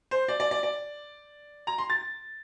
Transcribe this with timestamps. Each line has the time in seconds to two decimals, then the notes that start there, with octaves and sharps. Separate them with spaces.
0.11 C5
0.28 D5
0.40 D5
0.51 D5
0.63 D5
1.67 A#5
1.78 C6
1.90 A6